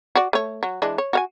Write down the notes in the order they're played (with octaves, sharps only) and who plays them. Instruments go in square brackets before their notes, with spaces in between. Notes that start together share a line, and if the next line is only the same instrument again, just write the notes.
[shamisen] F#4 D5
A3 C#5
F#3
E3 G#3 D4
C#5
F#4 F5 G#5